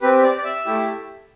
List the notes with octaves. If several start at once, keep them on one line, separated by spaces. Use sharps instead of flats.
C4 G4 B4
D5
D5
E5
A3 E4 G4